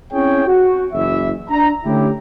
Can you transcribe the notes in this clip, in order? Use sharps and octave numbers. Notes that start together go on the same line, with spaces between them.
C4 C#4 E4 G#4 C#5 G5
F#4
F#1 E3 E5
D4 A#5
D3 A3 C#4 E4 G4